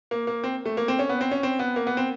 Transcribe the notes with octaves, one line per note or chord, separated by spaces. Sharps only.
A#3
A#3
C4
A3
A#3
C4
C#4
B3
C4
C#4
C4
B3
A#3
B3
C4